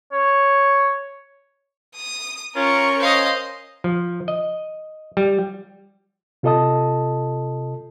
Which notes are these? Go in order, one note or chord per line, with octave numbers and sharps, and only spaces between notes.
C#5
D#6
C#4 F4 A#4 C#6
C5 D#5 F5
F3
D#5
G3
C3 F4 A4 D#5 A5 D#6